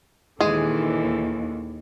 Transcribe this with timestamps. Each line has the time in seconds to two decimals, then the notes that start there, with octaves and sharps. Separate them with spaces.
0.41 D#2 A#2 D3 E3 G#3 G#4